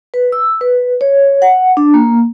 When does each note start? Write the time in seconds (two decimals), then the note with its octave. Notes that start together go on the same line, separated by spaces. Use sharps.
0.14 B4
0.32 E6
0.61 B4
1.01 C#5
1.42 F#5
1.77 D4
1.94 A#3